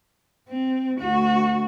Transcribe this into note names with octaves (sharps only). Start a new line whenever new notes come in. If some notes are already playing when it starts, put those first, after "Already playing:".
C4
D2 F#4